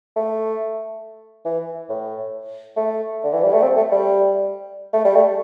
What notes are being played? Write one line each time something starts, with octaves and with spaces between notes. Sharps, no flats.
A3
E3
A2
A3
D3
E3
G3
A3
C4
A3
G3
A3
G3
A3